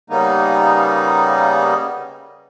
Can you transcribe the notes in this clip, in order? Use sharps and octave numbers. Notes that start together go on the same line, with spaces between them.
C#3 G3 A#3 B3 D#4